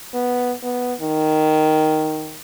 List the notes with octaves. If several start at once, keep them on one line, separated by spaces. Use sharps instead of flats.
B3
B3
D#3